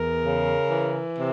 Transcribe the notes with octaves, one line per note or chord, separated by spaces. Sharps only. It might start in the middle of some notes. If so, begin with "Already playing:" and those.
Already playing: E2 A#4
C#3
E3
C3